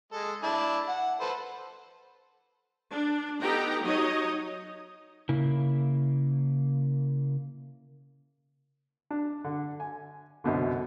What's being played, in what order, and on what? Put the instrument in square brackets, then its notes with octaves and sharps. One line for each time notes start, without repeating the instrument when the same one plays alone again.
[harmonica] G#3 A4
D4 E4 A5
F#5
A4 B4 C5
[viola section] D4
B3 D#4 G4 A4 G5 A#5
F#3 D#4 C#5 D#5
[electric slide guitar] C#3 A#3 E4
[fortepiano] D4
D3
G#5
C2 F#2 B2 D3